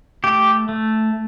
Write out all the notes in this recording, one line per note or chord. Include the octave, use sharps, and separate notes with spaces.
A3 G4
A3